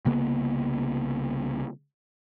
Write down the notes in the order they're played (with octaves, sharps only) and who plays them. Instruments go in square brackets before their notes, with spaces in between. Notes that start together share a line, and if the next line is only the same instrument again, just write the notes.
[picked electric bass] C2 C#3 A#3 B3